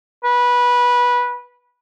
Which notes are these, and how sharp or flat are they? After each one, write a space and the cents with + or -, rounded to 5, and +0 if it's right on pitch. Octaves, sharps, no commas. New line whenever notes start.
B4 -15